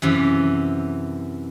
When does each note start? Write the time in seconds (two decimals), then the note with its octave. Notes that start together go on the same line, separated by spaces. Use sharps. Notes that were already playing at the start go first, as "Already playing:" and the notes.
0.02 F#2 C3 E3